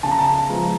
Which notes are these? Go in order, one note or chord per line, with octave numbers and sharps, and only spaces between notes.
C#3 A5
A#5
A5
F3 G#3 B3